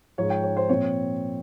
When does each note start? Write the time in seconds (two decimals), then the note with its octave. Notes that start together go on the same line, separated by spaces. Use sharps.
0.18 G#2 F3 G#3 C#5
0.30 G5
0.44 C#5
0.57 C5
0.69 A#2 F3 C4 C#5